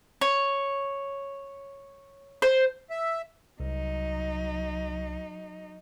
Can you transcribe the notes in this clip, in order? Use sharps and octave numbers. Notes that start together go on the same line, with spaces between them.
C#5
C5
E5
C2 F#3 D#4